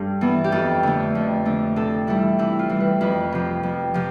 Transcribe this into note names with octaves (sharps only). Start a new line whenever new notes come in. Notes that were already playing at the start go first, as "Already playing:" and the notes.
Already playing: G2 A4
E3 B3
G4
F2 A4
D3 A3
F2
D3 A3
C3 A4
E3 G3 E4
C3 E4
F4
E3 G3
B4
F2 B4
C3 F3
F2
C3 F3